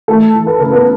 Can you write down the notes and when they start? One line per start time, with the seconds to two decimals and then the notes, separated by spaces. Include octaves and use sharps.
0.08 E3 A3 A4
0.34 E3
0.47 B4
0.60 C#3 A#4
0.73 B3 B4